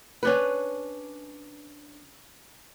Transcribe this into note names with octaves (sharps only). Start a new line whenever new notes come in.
C#4 D4 B4